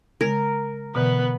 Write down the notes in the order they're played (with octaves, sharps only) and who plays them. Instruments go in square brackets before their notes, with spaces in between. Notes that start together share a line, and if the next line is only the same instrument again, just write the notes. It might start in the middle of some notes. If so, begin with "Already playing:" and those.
[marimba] C#3 G#3 G#6 [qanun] A#4
[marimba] B2 D3 E3 [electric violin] B3 B4